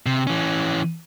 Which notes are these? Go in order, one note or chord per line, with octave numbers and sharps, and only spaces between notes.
C3
E3 C#4